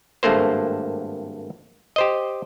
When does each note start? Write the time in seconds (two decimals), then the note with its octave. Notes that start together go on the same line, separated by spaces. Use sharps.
0.23 G#1 G2 A3 A#3 C5
1.96 G4 C5 D#5